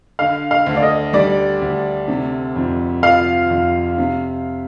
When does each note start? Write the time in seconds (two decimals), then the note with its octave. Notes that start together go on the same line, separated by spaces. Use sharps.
0.19 D3 F5
0.51 F5
0.66 D2
0.76 D5
0.82 D#5
1.13 G3 D5
1.62 D2
2.08 C3
2.56 F2
3.03 F3 F5
3.50 F2
3.98 C3